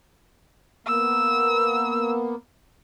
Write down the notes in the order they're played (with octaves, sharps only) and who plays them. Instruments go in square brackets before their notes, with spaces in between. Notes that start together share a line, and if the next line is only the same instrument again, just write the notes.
[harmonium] A#3 B3 [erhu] E6